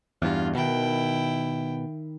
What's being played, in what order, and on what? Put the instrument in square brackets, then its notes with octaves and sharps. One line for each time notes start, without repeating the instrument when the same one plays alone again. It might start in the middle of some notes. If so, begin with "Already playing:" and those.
[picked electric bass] E2 G2 [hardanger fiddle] F4
[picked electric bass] B2 [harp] D#3 [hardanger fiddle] E4 G5